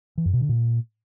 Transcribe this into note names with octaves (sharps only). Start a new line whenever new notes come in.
E3
F#2
B2
D3
A#2